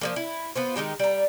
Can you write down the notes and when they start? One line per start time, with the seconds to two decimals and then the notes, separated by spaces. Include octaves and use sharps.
0.01 F3 G#3 A#3
0.16 E4
0.56 B3 F4 C5
0.76 D#3 G#3 D#4 G4
1.00 G3 A#5